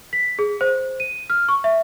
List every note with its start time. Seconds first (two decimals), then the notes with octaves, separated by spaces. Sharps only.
0.13 B6
0.39 G#4
0.61 C5
1.00 D#7
1.30 F6
1.48 C#6
1.64 E5